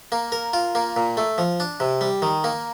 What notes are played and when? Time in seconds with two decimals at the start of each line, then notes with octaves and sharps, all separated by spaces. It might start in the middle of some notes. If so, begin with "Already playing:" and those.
0.12 A#3
0.32 A#4
0.53 F4
0.75 A#3
0.96 A#2
1.17 A3
1.38 F3
1.60 D4
1.80 C3
2.01 G3
2.22 D#3
2.44 A#3